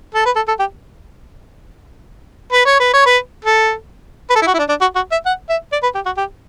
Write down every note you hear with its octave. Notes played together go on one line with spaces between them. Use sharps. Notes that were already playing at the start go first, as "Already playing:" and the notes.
A4
B4
A4
A4
G4
B4
C#5
B4
C#5
B4
A4
B4
A4
E4
F#4
E4
D4
D4
F#4
F#4
E5
F#5
E5
D5
B4
G4
F#4
G4